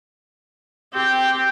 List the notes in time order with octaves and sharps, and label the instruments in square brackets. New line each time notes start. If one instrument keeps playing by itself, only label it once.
[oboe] C4 [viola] G4